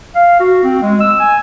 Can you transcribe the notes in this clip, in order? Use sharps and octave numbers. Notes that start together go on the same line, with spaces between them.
F5
F#4
C4
G#3
E6
G#5